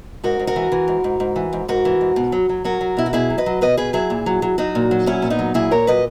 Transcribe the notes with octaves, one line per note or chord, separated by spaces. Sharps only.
G#2 F#4 A#4
G#2
F#4 A#4
E3
E3
G#2
G#2
G#2
E3
G#2
G#2 F#4 A#4
E3
G#2
B2
F#3
F#3
F#3 F#4 A#4
F#3
B2 E4
F#4
B2 E4 G#4
F#3
B4 D#5
F#3
B2 B4 D#5
B2 G#4 B4
F#3 E4 G#4
A#2
F#3
F#3
F#3 D#4 F#4
A#2
F#3
A#2 C#4 E4
A#2
B3 D#4
F#3
A#2 E4 G#4
A#2 A#4 C#5
F#3 B4 D#5